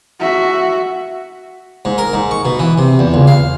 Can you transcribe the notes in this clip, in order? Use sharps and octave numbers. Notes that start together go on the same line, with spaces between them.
F#4 E5
G#2
A#4
G#2
C#6
B2
E3
C3
E2
C#2
F5